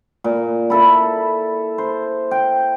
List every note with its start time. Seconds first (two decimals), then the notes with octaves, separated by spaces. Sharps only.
0.24 A#2
0.70 E4 A4 B5
1.78 C5
2.31 G5